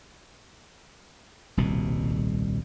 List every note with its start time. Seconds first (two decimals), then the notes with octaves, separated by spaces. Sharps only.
1.57 D#1 C2 B2